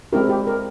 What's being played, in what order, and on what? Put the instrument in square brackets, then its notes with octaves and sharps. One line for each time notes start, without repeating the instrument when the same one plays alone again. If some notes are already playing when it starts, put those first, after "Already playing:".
[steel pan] G#3 C4 E4 G4 A#4
G4
A#4